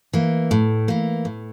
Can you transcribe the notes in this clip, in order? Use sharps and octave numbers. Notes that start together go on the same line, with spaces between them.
E3 A#3
A2
E3 A#3
A2